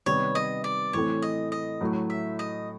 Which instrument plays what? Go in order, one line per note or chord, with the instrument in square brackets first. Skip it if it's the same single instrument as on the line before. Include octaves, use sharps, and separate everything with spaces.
[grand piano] C3 D#3 G3 B3 [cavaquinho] C#5
[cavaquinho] D#5
D5
[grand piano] A2 E3 A3 C4 [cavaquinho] C#5
[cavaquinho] D#5
D#5
[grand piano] A2 F#3 A3
[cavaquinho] E5
D#5